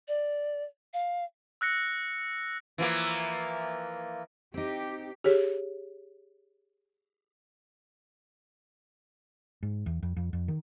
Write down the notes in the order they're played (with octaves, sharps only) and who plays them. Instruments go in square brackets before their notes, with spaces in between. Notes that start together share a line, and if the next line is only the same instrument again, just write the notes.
[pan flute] D5
F5
[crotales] E6 F#6 A#6 C#7
[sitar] E3 F3 A#3
[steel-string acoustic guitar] C4 D#4 [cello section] G4
[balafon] G4 G#4 C#5
[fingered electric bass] G#2
E2
F2
F2
F2
D#3